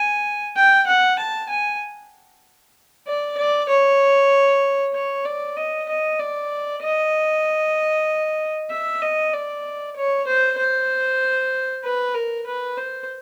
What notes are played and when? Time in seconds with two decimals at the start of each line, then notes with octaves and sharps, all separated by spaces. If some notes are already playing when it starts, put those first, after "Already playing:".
Already playing: G#5
0.56 G5
0.87 F#5
1.19 A5
1.50 G#5
3.07 D5
3.38 D5
3.69 C#5
4.94 C#5
5.25 D5
5.57 D#5
5.89 D#5
6.19 D5
6.83 D#5
8.71 E5
9.02 D#5
9.34 D5
9.96 C#5
10.27 C5
10.58 C5
11.84 B4
12.15 A#4
12.47 B4
12.77 C5